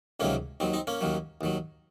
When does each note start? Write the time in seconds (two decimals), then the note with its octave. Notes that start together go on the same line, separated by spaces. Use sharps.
0.20 C#2 C3 D#3 F#3 A#3 C#4
0.60 D#2 D#3 F#3 C4
0.73 C4 D#4
0.87 A#3 C#4
1.01 D#2 D#3 F#3
1.41 D#2 D#3 F#3